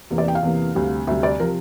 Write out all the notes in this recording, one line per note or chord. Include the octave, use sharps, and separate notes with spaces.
E2 C3 E3 A#3
D5
G5
F5
E2 C3 E3 A#3
D2 C3 G3
D2 C3 G3 E5
D5
C3 F3 A#4